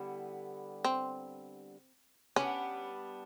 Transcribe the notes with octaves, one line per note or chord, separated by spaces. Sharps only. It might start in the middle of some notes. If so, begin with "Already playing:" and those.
Already playing: D3 G3 B3 E4
C4
G3 B3 C#4 D4